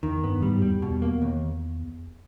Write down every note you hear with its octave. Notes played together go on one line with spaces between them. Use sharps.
E2 D#3
G2 B3
G#2 G3
E2 G3
B2
E2
A#3
D#2